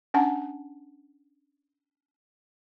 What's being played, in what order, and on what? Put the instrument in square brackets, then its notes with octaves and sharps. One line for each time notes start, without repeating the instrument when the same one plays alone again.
[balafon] C#4 D4 F#5 G#5 A5